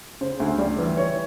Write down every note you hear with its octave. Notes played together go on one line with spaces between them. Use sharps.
C#3 C5
D2
G3 D5
E3
E3 C#5